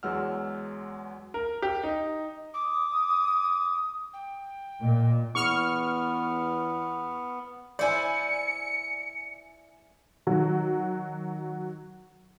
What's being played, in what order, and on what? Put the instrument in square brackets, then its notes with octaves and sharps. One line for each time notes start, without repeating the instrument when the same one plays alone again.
[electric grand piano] E2 F#3 G#3 F#5 E6 F6
[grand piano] A#4
G4
D#4
[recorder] D6 [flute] D#6
[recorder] G5
[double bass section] A#2 [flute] D#5
[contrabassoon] E2 [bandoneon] B3 [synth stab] C#6 F6
[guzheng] E4 C5 [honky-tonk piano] D5 G#5 [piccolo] C#7
[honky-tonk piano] D#3 F#3 F#4